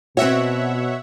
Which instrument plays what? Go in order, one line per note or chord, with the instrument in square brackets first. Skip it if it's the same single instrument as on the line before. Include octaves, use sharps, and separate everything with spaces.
[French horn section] B2 [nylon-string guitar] C4 F#4 [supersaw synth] C#5 E5 F#5